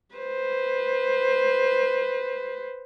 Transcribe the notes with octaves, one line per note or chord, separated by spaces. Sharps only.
B4 C5